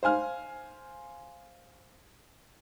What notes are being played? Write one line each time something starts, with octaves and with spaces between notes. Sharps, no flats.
C5 F5 G#5 F6